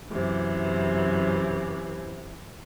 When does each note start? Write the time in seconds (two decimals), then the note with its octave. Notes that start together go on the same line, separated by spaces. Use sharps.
0.10 F#2 C3 E3